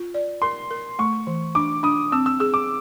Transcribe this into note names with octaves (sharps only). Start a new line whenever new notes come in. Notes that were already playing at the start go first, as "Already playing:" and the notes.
Already playing: F4
D5
A#4 C6
A#4
A3 C#6
E3
D4 D6
D4 D#6
C4 E6
E6
G#4 E6
D6